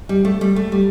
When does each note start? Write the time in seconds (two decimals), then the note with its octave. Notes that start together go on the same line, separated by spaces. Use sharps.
0.09 G3
0.25 A3
0.41 G3
0.56 A3
0.72 G3